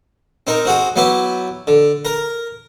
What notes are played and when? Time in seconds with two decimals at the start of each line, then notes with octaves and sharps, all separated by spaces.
0.47 C4 D#4 A#4
0.65 C4 F#4 G#4
0.96 F#3 B3 E4 G4
1.67 D3
2.05 A#4 A#5